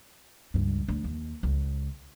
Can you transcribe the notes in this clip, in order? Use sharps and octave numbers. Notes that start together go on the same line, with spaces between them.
C#2 G2
D2
D#2
C#2